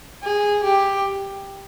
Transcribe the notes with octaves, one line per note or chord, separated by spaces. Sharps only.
G#4
G4